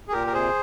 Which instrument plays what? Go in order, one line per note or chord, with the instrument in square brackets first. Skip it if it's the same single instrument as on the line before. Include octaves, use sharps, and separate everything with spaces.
[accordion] G#4
A#2 G4 A#4
A#4
C3 G#4 C5